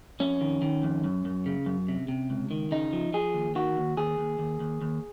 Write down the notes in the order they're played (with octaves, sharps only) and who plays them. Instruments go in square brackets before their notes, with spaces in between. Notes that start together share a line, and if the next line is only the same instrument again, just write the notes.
[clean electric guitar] F2 C#4
D#3
D#3
F2
F#2
F#2
C#3
F#2
C3
C3
C#2
D#3
C#3 D#4
F3
F3 G#4
D#2
D#3 F#4
D#2
D#2 G#4
D#2
D#2
D#2
D#2